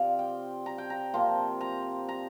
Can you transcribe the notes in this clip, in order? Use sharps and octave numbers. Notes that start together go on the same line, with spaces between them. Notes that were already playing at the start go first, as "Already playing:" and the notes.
Already playing: C3 F3 C4 D5 F5
G5
A#5
G5
A#5
C3 F3 A#3 C6
A#5
A#5